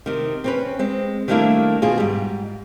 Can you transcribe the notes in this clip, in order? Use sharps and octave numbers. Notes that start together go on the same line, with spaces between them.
C3 D#3
C4 C#4 B4
G#3 C4
D#3 G3 A3 A#3 D4 E4
B2 F4 G#4
G#2 G3